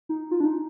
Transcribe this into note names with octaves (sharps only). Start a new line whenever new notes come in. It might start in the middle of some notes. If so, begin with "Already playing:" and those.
D#4
F4
D4
D#4